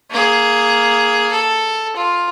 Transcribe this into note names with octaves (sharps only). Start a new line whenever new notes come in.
A#3 G#4
A4
F4